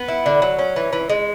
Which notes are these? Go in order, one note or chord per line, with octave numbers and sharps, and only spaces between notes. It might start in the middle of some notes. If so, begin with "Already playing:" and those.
Already playing: B3
E4
D3
F#3
C#4
E3
E3
G#3